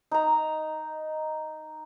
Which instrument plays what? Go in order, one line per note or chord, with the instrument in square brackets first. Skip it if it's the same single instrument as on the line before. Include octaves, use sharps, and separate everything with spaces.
[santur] D#4 A#5